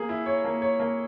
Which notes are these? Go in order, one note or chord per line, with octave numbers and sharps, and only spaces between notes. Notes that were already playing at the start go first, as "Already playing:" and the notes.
Already playing: A#3 G#4
E4
C#5
A#3
C#5
A#3